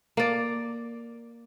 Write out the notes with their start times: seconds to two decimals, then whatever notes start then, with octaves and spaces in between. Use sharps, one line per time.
0.17 A#3 D5